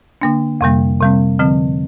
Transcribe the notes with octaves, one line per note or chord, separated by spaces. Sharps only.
D3 A#3 D4
F2 C3 G3 A#3
C3 G3 C4
D3 F3 C4